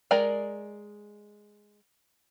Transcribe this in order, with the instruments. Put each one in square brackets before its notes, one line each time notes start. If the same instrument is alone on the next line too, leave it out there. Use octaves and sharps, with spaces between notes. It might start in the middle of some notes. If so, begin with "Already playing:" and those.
[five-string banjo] G#3 A#4 D5 G#5 A#5